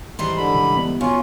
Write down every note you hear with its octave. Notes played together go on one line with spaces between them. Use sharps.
G#2 E3 G3 C6
D3 B5
C#3
B3
B2 C#4 F4